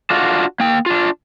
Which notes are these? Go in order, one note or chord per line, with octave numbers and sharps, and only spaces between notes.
D4 F4 F#4
A#3 G5
D4 F4